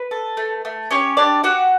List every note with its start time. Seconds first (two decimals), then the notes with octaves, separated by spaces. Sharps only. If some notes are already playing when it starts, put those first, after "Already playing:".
Already playing: B4
0.11 A4
0.37 A3
0.65 A3
0.91 C#4 G4 C#5
1.17 D4 G4 D5
1.43 F#4 G4 F#5